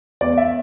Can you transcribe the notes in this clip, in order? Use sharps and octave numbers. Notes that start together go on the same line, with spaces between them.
E2 D5
E5